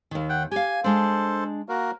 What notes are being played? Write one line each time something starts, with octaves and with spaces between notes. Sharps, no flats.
D#2 D#3
F#5 G5
G4 F5 G#5
G#3 D4 A4 C5
A#3 F#4 A#4